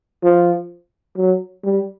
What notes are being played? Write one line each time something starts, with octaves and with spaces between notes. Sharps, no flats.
F3
F#3
G3